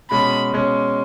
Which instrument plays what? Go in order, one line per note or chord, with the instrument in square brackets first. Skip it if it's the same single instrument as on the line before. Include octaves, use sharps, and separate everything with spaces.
[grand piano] B2 G#3 C#4 [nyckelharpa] B5
[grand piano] B2 G#3 C#4